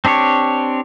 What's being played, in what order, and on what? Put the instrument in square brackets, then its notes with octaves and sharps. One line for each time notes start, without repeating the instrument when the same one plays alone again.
[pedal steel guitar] C4 D4 G4 C#5